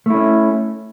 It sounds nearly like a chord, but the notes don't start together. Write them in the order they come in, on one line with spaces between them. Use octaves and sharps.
A3 E4 C#4